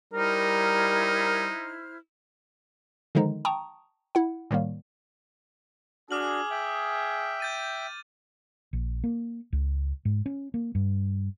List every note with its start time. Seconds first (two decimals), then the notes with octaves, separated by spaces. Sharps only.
0.13 G3 D#4 E4 A#4 C5 F6
3.15 D3 D#3 F3 G#3 D#4
3.45 G5 A5 A#5 C#6 D#6
4.15 E4 F#5
4.51 A2 D#3 G3 A#3
6.11 D4 F#4 G#4 D6 F6 F#7
6.51 E5 G5
7.40 G6 A6 D#7
8.73 A#1
9.04 A#3
9.53 C#2
10.05 G#2
10.26 C#4
10.54 A#3
10.75 G2